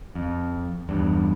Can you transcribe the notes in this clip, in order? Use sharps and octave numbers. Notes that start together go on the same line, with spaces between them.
F2
E2 G2